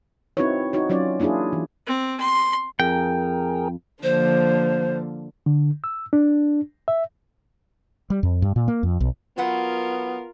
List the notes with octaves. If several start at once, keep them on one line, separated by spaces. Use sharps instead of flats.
C4 D#4 E4 F#4 B4 C#5
D#4 F#4 C#5
F#3 C#4 F4 D5
A#3 D4 E4 F4 G#4
E3
C4
C6
F2 G#4 A#4 G5
D3 F3 A#3 C5
D3
E6
D4
E5
G3
F2
G2
A#2
A#3
F2
B1
F#3 B3 F4 A#4 B4 F#5